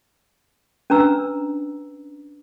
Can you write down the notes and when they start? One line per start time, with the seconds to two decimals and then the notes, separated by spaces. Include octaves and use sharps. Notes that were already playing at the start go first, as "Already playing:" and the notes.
0.90 C#4 D4 B4 A#5 E6